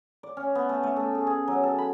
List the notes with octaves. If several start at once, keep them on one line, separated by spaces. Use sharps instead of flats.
D5
C#4
B3
A3
A3
A4
G#4
G#4
F#3
A4
B5